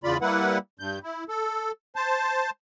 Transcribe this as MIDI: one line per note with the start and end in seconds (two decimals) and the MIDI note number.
0.04 0.17 40
0.04 0.17 49
0.04 0.17 65
0.04 0.17 74
0.04 0.17 83
0.21 0.58 55
0.21 0.58 58
0.21 0.58 64
0.21 0.58 71
0.21 0.58 78
0.80 0.99 43
0.80 0.99 91
1.04 1.24 64
1.29 1.71 69
1.96 2.50 72
1.96 2.50 81